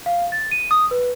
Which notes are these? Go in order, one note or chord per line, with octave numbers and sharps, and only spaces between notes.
F5
A6
D#7
D#6
B4